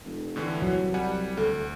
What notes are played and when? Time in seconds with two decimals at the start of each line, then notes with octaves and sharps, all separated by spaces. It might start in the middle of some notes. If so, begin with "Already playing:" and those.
0.05 F1
0.36 A2 D3 E3
0.62 C2 F#3
0.94 G3 F#5 G#5
1.37 D2 A4